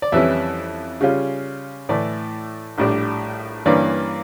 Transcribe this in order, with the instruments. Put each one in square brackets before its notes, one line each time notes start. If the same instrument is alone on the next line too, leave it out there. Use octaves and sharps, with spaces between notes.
[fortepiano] D5
F2 E3 G3 C#4 E4 E5
C#3 G3 C#4 F4
A2 E3 A3 D5
A#1 A2 G3 D4
G2 E3 A#3 C#4 D5